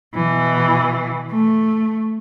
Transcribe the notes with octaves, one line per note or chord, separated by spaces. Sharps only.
B2 E3
A3